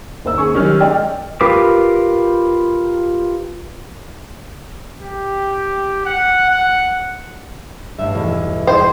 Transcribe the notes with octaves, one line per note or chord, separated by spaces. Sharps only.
D#2 C5 E6
C#4 G#4 C#6
D#3 F#3 C#4 G4 F6
G#3 D5 D#5 G5
F4 G4 A#4 B4 D6
G4
F#5
F#5
A1 G2 E5
B1 E2
G#4 C5